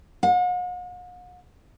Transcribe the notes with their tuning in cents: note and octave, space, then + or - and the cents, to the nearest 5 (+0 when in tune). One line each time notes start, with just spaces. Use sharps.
F#5 -45